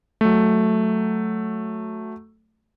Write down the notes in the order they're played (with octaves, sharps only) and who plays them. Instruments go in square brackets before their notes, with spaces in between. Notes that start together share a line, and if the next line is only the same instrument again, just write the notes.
[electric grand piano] F#3 A3